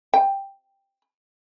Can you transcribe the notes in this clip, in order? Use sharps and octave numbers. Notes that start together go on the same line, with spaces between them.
G5